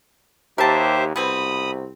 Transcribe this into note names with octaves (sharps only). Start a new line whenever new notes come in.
D#2 G4 A#4 C5 E5 A5
C2 B2 C4 B5 D#6